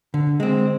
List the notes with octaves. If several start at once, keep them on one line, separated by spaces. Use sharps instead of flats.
D3
G#3 C4